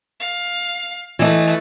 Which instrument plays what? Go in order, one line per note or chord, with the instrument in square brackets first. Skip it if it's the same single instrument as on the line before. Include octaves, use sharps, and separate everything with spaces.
[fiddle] F5
[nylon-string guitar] E3 D#5 [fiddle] A3 B4